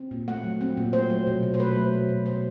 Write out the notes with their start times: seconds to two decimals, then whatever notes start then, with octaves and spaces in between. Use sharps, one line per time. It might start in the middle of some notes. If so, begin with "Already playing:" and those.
Already playing: C4
0.11 A#2
0.28 A3 F#5
0.44 F#3
0.61 C4
0.77 A#2
0.93 A3 C5
1.10 F#3
1.27 B2
1.43 B2
1.54 C5
1.59 A3 B4
1.76 F#3
1.93 B2
2.09 B2
2.26 G#3 C5